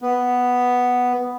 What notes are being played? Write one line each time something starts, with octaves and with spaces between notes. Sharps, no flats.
B3